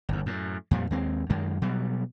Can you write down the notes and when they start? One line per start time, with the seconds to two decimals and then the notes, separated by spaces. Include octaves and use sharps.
0.09 G1 D#2
0.26 F#2 A2
0.71 F2 A#2 G3
0.91 D#2 G#3 C4
1.30 F#2 D#3 G#3
1.62 B2 F#3 G3